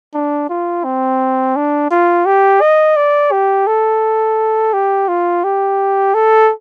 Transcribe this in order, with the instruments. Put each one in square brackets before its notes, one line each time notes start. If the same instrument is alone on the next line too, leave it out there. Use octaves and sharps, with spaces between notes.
[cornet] D4
F4
C4
D4
F4
G4
D#5
D5
G4
A4
G4
F4
G4
A4